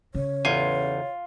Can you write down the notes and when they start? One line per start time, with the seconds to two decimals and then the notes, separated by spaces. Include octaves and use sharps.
0.15 C#3 C#5
0.45 A1 E2 F4 G#5